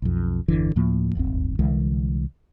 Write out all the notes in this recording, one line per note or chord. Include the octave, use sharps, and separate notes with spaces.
B1 F2
G1 E2 D3 E3
D2 A2 F3 A#3
D1 G1 D#2 C4
C2 D3 E3 G#3